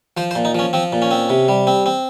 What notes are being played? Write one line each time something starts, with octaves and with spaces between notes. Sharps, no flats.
F3 C5
C5
A#2
D#4
F3 C#4
F3 C4
A#2
C#4
C4
C3
G3
C4
C4